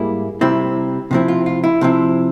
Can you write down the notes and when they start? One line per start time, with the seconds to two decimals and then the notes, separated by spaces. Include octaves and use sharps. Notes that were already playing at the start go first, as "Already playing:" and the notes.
Already playing: G#2 G3 A#3 E4 G#4
0.41 C3 G3 C4 E4
1.11 C3 F3 C4 E4
1.28 F4
1.46 F4
1.64 E4
1.81 C3 F3 C4 E4